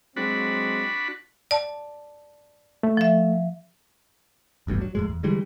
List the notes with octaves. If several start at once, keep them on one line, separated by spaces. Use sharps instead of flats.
F#3 G#3 C4 D4 F#4 B5
D5 A5
A3
F3 E5
D#1 A1 G2 B2
F#3
F2 A2 G#3
E2
D3 E3 G3 G#3